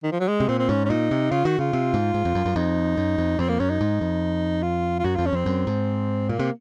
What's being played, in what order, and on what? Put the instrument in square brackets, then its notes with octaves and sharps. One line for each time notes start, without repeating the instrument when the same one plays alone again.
[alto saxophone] D#3
F3
F#3
G#3
[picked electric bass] C3
[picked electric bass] A#2 [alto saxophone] C4
[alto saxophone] C4
[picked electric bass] G#2 [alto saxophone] C#4
[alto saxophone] C#4
[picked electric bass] A#2 [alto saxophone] D#4
[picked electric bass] C3
[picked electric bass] C#3 [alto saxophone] F4
[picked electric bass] D#3 [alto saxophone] F#4
[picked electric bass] C#3 [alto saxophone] F4
[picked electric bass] C3
G#2
G#2
F2
F#2
F#2
[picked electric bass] F2 [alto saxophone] D#4
[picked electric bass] F#2
F2
[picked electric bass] F2 [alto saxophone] C4
[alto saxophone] A#3
[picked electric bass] F#2 [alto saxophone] C#4
[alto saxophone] D#4
[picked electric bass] G#2
F2
[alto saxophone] F4
F4
[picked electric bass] F#2 [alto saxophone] F#4
[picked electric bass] F2 [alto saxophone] F4
[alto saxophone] C#4
[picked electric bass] F2 [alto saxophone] C4
[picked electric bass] F#2
G#2
[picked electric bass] A#2 [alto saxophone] A#3
[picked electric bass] C3